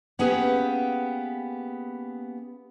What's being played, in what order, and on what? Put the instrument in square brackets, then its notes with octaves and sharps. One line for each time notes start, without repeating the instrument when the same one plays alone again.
[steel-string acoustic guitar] A#3 B3 C#4 G4 G#4 B4